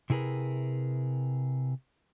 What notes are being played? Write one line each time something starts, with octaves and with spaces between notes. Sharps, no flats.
C3 E4 G#4 A#4 B4